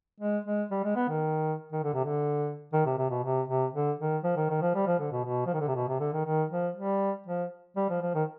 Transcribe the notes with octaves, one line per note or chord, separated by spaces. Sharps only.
G#3
G#3
G3
G#3
B3
D#3
D#3
D3
C3
D3
D#3
C3
C3
B2
C3
C3
D3
D#3
F3
D#3
D#3
F3
G3
F3
D3
B2
B2
F3
D#3
D3
C3
B2
C3
D3
D#3
D#3
F3
G3
F3
G3
F3
F3
D#3